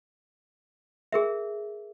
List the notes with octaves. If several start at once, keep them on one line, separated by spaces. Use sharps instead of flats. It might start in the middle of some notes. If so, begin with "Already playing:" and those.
G#4 A#4 E5